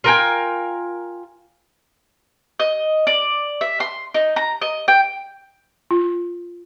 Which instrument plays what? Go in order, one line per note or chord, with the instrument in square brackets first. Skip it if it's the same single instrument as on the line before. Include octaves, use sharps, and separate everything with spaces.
[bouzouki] F4 A#4 G5 G#5
[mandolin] D#5
D5
E5
C6
D#4
A#5
D#5
G5
[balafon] F4